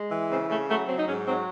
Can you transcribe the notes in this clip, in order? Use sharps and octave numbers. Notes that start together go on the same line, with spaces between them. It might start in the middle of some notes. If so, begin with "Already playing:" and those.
Already playing: G#3
E3
C#3 C4
C#3 A3
F#3 A3
F#3 C4
D#4
G#2 C#4
F#3 C4